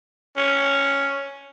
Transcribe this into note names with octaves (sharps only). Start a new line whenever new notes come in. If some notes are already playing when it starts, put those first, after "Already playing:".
C#4